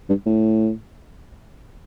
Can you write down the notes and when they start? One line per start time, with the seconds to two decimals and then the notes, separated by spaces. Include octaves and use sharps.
0.09 G2
0.26 A2